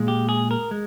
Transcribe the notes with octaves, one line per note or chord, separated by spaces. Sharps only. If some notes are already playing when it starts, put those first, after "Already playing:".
Already playing: A#2 G#3
G4
G#4
A#4
G#3